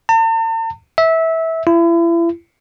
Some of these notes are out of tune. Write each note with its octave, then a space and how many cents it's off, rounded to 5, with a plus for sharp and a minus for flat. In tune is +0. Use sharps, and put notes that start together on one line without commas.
A5 +45
E5 -20
E4 +35